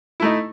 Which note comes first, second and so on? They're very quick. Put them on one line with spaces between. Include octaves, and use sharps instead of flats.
E4 A3 D#4